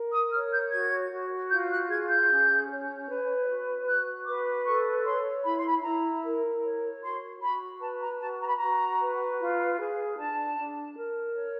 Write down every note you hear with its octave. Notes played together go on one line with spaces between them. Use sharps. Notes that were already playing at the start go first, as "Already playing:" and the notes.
Already playing: A#4
D#6
C#5 F6
G6
F#4 G#6
F#4
F4 G6
F#6
G#4 G#6
G6
C#4
C#5
B4
F#4
F#4 F#6
B4 D6
A4 C#6
C#5 C6
E4 B5
C6
B5
E4 A#5
A#4
C#5
F#4 C6
F#4 B5
B4 A5
A#5
F#4 A5
A#5
B5
F#4 A#5
B4
F4
G#4
D4 A5
D4
A#4
C#5